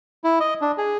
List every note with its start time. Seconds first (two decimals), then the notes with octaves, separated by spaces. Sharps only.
0.24 E4
0.40 D#5
0.61 D4
0.78 G#4